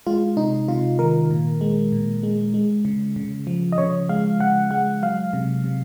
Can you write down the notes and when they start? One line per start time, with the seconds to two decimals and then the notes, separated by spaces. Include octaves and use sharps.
0.06 G#3 F4
0.37 C3 D#4
0.68 C3 F4
0.99 D#3 A#4
1.30 A#2
1.61 G#3
1.92 A#2
2.23 G#3
2.54 G#3
2.85 C#3
3.16 C#3
3.47 F3
3.72 D#5
3.78 C#3 C#5
4.09 G#3 F5
4.40 C#3 F#5
4.71 G#3 F#5
5.02 F#3 F5
5.33 C3
5.64 C3